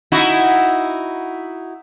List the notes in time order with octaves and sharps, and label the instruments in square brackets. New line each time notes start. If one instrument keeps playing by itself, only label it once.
[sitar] D#4 E4 F#4